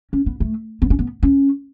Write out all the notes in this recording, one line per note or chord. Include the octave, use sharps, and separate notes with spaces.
C#4
B3
A3
B3
C#4
B3
C#4